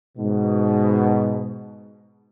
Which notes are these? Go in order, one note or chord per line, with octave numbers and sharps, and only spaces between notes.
G#2 B2